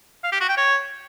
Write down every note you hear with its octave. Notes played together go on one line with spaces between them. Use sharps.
F5
G4
F#4
G5
C#5